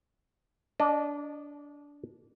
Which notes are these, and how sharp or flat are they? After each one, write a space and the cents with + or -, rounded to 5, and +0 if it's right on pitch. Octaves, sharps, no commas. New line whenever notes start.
D4 -20 D#5 -40